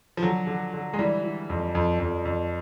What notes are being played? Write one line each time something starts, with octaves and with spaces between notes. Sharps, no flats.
F3
D3 F#3
D3
D3
G#3
E3 G3
E3
F2
F2
F2
F2